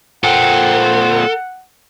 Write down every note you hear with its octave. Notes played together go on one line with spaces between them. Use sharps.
A#2 C4 A4 F#5